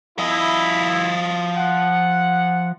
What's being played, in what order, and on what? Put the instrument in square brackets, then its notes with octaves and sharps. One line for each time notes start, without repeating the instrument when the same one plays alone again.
[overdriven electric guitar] F3 D#5 [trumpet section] E4
[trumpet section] F#5